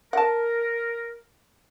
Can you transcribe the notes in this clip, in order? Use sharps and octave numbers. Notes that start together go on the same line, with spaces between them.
A#4 F#5 A5